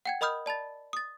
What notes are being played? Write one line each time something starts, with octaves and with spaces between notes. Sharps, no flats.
F#5 G5 G#6
A#4 D#5 B5 D#6 F6 G6
D5 A5 B5 A6
D#6 A6